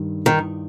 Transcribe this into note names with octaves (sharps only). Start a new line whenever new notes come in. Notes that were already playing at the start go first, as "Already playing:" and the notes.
Already playing: G2 D#3
D#3